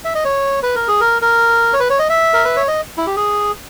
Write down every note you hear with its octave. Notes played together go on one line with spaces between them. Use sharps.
E5
D#5
C#5
B4
A#4
G#4
A#4
A#4
C#5
B4
C#5
D#5
E5
A#4
B4
C#5
D#5
E4
G4
G#4